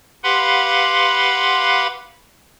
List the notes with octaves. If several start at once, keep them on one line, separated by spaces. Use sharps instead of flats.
G4 B4 F5 F#5 B5 C6